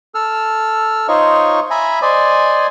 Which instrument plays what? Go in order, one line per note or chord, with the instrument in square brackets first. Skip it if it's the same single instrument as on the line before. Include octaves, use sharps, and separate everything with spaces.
[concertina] A4 E6 F6
D#4 F4 C5 C#5 D#5 C#6
E5 G#5 A#5 B5
C5 D5 D#5 G#5